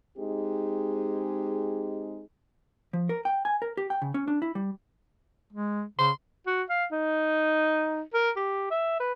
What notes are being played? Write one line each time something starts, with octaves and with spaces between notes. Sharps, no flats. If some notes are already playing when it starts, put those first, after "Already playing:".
G#3 C4 D#4 G4 G#4
F3
A#4
G5
G#5
A#4
G4
G5
C#3
C#4
D4
E4
G3
G#3
C#3 C6
F#4
F5
D#4
A#4
G4
E5
B4